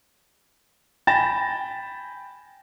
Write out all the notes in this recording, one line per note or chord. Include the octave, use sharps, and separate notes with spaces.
G5 G#5 B5 A6 A#6 E7